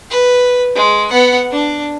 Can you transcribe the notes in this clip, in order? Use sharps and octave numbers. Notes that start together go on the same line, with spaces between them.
B4
G#3
B3 F#5
D4